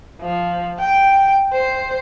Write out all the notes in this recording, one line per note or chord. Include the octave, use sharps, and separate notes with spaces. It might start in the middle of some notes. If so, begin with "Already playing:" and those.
F3
G5
C5